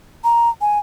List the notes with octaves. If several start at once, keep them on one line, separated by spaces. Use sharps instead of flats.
A#5
G#5